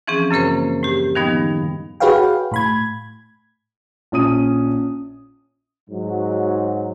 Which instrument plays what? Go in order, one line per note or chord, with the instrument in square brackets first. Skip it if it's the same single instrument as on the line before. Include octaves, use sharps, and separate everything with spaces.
[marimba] E3 F3 C4 C#4 G#4
F#2 C#3 A#3 A#4 C5
A2 G4
D#3 F3 G3 B3 D#4
[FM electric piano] F#4 G#4 B4 C#5 F5 G5
A2 B5 G#6
[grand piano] A#1 C#4 D#6 D#7
[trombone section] G#2 F#3